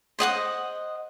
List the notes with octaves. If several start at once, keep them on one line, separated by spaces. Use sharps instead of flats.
C5 D#5 F#5 D#6